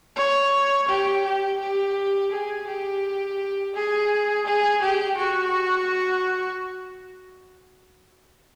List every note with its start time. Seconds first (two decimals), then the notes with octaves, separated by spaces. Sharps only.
0.16 C#5
0.88 G4
1.24 G4
1.60 G4
2.31 G#4
2.67 G4
3.74 G#4
4.46 G#4
4.81 G4
5.17 F#4